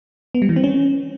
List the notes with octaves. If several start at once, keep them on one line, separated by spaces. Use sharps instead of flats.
B3
G3
E3
C4
C#4